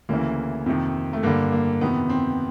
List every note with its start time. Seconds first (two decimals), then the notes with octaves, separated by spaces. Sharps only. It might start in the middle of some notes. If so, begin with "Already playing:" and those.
0.09 D2 C#3 E3 A#3
0.66 F2 C3 D#3
1.13 A3
1.23 G2 D3 A#3
1.52 A#3
1.81 F2 C3 D#3 B3
2.10 C4